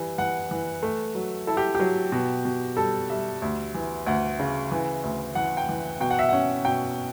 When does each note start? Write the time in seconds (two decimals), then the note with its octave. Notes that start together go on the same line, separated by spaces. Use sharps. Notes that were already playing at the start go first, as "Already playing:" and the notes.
Already playing: E3 G3
0.18 E3 F#5
0.51 E3
0.83 A3
1.15 F#3
1.47 E4 A4
1.57 G4
1.75 F#3 G4
2.12 B2
2.45 B2
2.77 G3 A4
3.10 G3 E5
3.42 D2
3.74 E3
4.06 D2 F#5
4.40 C#3
4.71 E3
5.04 D2
5.35 E3 F#5
5.57 G5
5.69 E3
6.00 B2 G5
6.10 F#5
6.19 E5
6.29 C#4 F#5
6.65 B2 G5